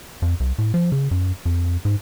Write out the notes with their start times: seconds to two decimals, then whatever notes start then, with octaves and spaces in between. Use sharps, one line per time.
0.22 F2
0.40 C2
0.58 A2
0.74 F3
0.92 C#3
1.11 F#2
1.45 F2
1.85 G#2